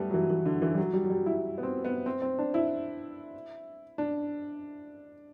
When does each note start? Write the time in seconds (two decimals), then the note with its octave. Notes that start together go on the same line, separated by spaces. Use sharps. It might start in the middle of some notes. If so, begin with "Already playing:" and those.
Already playing: G3 A3 B3
0.10 F#3
0.14 E3
0.30 E3
0.46 D3
0.62 E3
0.74 G3
0.78 F#3
0.93 G3
1.05 F#3
1.10 G3
1.26 E4
1.58 B3
1.63 C4
1.85 B3
2.06 C4
2.22 C4
2.39 D4
2.54 E4
3.98 D4